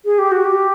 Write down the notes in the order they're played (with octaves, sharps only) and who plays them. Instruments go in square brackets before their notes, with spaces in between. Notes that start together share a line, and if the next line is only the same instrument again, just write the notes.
[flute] G#4
G4
F#4
G4